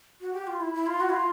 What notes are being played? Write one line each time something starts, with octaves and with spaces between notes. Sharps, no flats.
F#4
G4
F4
E4
E4
F4
F#4
E4
F4